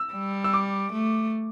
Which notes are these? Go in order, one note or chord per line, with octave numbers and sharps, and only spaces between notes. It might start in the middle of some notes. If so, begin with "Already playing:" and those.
Already playing: E6
G3
E6
D6
A3